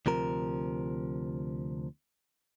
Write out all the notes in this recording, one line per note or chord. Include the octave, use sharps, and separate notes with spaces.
D2 C3 F3 A#4